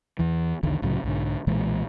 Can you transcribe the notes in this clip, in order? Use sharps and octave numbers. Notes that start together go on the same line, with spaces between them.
E2 E3
B1 E2 D3 D#3
C2 A2 C#3 F#3
B1 G#2 D3
B1 A#2 E3 G#3